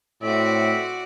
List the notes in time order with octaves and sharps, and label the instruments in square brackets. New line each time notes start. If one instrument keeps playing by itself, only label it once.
[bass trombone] A2 [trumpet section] C4 E5 [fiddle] F#4 D5